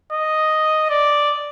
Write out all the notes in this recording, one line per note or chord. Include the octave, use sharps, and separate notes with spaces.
D#5
D5